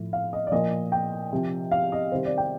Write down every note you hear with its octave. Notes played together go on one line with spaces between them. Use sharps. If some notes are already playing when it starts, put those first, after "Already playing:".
Already playing: A2 F3
F5
D#5
D5
A#2 F3 D#5
G5
C3 F3
F5
D#5
C3 D#3 G3 C5
D5
G5